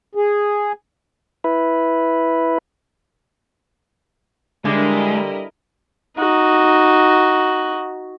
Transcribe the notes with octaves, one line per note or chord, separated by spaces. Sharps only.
G#4
E4 B4
D3 G3 G#3 E4 A#4 D#5
D#4 F#4